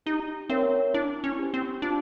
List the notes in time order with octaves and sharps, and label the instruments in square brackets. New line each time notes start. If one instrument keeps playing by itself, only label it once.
[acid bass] D#4 [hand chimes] G4
[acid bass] C4 [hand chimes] A#4 C#5 E5
[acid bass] D4 [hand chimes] E4
[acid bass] C#4
[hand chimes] G4 C5
[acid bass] C4
[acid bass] D4 [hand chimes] F4